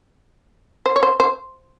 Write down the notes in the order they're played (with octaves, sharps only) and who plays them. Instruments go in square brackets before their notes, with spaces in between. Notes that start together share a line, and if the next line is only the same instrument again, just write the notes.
[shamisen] C5
C#5
C5
C5